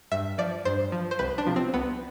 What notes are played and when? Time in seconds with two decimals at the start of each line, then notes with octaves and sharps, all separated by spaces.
0.12 G2 E5
0.38 F3 D5
0.65 G2 C5
0.92 F3
1.11 C5
1.19 C2 B4
1.38 D4
1.47 C3 F3
1.56 C4
1.74 C2 B3